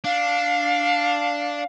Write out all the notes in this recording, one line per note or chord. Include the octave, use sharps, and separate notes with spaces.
D4 F5